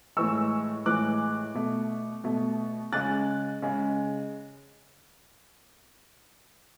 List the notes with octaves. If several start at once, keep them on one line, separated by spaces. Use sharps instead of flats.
A2 E3 G#3 C#6 E6
A2 E3 G#3 D6 F#6
B2 A3
B2 A3
C#3 G#3 F#6 A6
C#3 G#3